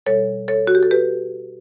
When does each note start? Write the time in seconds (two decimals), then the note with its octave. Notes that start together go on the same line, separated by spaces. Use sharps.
0.06 B2 G3 A4 C#5
0.48 A4 C#5
0.67 F#4
0.75 G4
0.83 A4
0.91 G4 B4